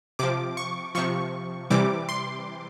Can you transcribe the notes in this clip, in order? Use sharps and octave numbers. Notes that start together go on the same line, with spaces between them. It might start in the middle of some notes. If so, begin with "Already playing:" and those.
C3 F3 D6
C#6
C3 F3 C#6
C3 E3 G3 D6
C6